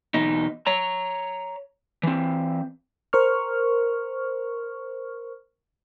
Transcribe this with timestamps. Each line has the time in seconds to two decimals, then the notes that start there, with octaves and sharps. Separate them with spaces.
0.14 E2 B2 D#4
0.66 C#5 A#5
2.03 E3 C4
3.13 A#4 C5 C#6 F6